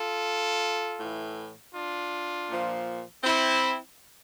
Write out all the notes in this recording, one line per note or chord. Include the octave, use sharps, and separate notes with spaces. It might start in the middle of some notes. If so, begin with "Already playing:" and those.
Already playing: F4 A4
A2 E3
D4 F4
A#2 F3
C4 E4